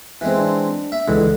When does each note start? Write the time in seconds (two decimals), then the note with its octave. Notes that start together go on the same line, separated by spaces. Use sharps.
0.21 E3 G#3 C4
0.39 D4
0.92 E5
1.08 C#2 D3 E3 G#3